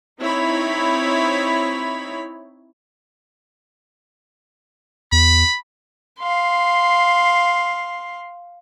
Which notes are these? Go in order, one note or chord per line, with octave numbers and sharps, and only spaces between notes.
C4 D#4 E4 C#5 B5
E2 B5
F5 C6